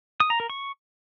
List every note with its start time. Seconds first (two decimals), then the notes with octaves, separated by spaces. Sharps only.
0.20 D#6
0.30 A#5
0.40 A#4
0.50 C#6